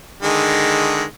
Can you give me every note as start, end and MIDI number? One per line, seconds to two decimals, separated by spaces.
0.22 1.03 50
0.22 1.03 51
0.22 1.03 56